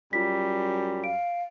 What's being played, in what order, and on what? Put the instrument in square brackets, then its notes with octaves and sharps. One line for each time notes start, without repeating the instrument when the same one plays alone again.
[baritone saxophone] F#2 [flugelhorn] G3 [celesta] F4 B6
[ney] F5 [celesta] D7